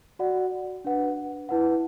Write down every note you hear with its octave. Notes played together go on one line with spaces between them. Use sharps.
F#4 D5 F#5
D4 B4 F#5
E4 B4 F#5